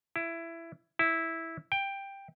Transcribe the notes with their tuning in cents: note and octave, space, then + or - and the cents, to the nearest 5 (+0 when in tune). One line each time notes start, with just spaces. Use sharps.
E4 +15
E4 -10
G5 +10